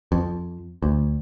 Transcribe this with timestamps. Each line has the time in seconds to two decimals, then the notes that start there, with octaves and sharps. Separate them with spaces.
0.12 F2
0.82 D2